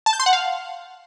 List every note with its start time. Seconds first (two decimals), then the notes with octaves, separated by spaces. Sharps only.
0.06 A5
0.13 G6
0.20 C6
0.26 F#5
0.33 F5